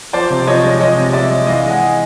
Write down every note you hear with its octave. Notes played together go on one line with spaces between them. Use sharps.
F3 C5 D5
C3
F3 C#5 D#5
G#3
F3 C#5 D#5
C3
G#3 D5 E5
G#3
E3 D#5 F5
G#3
F#5 G#5